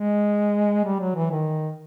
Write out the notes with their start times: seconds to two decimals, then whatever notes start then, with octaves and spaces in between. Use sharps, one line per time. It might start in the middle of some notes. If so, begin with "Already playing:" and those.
Already playing: G#3
0.85 G3
1.00 F#3
1.16 E3
1.32 D#3